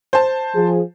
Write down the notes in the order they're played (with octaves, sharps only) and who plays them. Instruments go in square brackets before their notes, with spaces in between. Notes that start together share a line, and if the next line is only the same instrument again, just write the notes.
[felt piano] C5 A5
[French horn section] F3 G#4